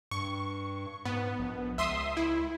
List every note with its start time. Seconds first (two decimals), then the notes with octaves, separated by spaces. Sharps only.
0.11 G2 C#6
1.05 G#2 B3
1.39 A#1
1.78 C#2 E5 C6 D#6
2.17 E4